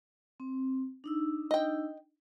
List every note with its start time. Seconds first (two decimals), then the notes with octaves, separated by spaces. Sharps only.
0.40 C4
1.04 D4 D#4 E6
1.51 D#5 G5